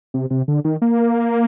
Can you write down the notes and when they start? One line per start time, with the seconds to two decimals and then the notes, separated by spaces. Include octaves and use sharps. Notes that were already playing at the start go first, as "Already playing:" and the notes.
0.14 C3
0.30 C3
0.48 D3
0.65 D#3
0.82 A#3